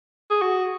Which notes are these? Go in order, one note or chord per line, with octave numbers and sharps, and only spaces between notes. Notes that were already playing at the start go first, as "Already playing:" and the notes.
G#4
F#4